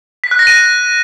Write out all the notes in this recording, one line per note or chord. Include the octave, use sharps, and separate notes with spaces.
B6
F#6
A#6
D#7